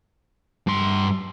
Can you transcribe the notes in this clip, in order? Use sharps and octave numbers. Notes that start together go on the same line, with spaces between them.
G2 C6